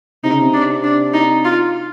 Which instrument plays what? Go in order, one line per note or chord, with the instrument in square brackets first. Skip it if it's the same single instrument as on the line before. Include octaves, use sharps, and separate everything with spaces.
[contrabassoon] C3 [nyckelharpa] D#4
[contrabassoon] C#3
C3
[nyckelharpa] D4
D4
D#4
F4